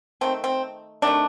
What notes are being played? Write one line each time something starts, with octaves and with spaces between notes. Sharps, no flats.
D#3 A3 C4
C4
C3 D#3 A3 D4